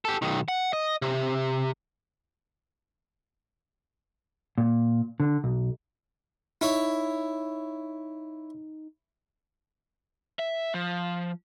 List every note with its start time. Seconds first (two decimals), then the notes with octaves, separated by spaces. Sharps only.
0.05 G4 A4
0.22 B1 D#3
0.48 F#5
0.73 D#5
1.02 C3
4.58 A#2
5.20 D3
5.44 B1
6.61 D#4 E4 C#5
10.39 E5
10.74 F3